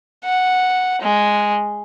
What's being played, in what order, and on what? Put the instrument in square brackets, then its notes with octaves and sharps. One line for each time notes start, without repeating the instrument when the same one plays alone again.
[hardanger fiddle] F#5
G#3